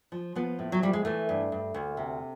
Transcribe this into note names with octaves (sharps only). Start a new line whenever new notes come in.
F3
F3 B3
A2
F#3
F3 G3
G#3
E3 A3
G2
G2
D2
C3